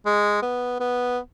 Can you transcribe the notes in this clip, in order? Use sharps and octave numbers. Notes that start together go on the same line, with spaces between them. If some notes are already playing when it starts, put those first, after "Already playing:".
G#3
B3
B3